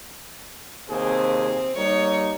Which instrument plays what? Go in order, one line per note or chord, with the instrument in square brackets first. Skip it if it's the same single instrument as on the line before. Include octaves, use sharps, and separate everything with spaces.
[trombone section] D#2 C3 G#4 [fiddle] C4
[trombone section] G3 A#3 D#4 [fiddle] C#5